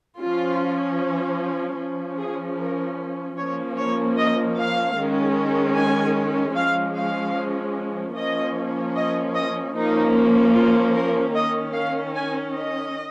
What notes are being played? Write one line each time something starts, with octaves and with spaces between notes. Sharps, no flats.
F3 C#4 F4
F3 C#4
G#4
A#4
F3 A#3 C#4 C#5
C#5
D#5
F5
D#3 G#3 C#4
G#5
F3 G#3 C#4 F5
F5
F3 A#3 C#4 D#5
D#5
D#5
F3 A#3 C#4 D#4
F4
A#4
D#3 C#4 D#5
F5
G#5
D#5